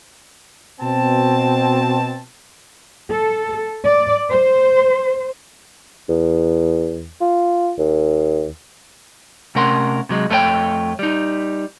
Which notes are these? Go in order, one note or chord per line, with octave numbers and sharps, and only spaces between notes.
B2 C4 A5
A4
D5
C5
E2
F4
D#2
C3 A3 C#4 A#4 F#5 C6
C3 F#3 G#3
F2 A3 B3 A4 C#5 G5
G3 D#4